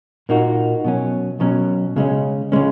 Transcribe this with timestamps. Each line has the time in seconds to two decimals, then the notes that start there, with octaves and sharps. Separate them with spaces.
0.29 A#2 A#3 D#4 F#4
0.84 B2 F#3 C#4
1.40 B2 F#3 C#4
1.96 C#3 G#3 C#4
2.52 C#3 G#3 C#4